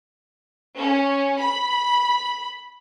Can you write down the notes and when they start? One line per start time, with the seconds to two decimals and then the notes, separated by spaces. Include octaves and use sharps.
0.77 C#4
1.39 B5